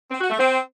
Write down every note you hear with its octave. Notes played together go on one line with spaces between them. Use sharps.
C4
F#4
A3
C4